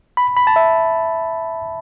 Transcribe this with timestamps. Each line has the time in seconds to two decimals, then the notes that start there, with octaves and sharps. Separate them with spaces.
0.17 B5
0.37 B5
0.47 A5
0.56 E5